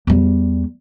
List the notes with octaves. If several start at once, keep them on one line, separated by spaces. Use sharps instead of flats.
E2 G3